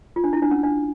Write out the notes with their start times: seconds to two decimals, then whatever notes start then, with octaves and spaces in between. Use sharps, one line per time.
0.16 F4
0.24 D4
0.33 E4
0.42 D4
0.51 C#4
0.63 D4